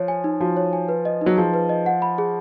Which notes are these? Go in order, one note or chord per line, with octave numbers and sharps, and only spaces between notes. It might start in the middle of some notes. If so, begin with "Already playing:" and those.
Already playing: F3 C#5
G#5
D#4
F3 F#4
C#5
G#5
B4
D#5
F#3 D#4
F3 G#4
B4
D#5
F#5
B5
G#4